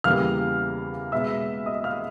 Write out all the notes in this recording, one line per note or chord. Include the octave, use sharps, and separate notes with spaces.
E2 C#3 E3 G3 A#3 F5 F6
B2 G#3 B3 E5 E6
D#5 D#6
F5 F6